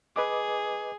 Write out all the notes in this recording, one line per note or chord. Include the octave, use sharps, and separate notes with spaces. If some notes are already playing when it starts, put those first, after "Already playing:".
G#4 B4 D#5 D6